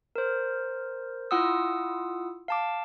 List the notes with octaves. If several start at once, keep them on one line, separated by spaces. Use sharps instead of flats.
A#4 C5
E4 F4 F#5 D#6 E6
F5 A5 D6